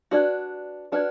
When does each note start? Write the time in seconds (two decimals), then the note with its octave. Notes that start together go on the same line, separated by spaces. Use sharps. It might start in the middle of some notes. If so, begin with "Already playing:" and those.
0.11 D4 F#4 G4 B4 D5
0.92 D4 F#4 G4 B4 D5